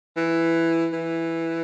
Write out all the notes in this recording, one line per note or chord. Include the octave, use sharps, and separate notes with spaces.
E3
E3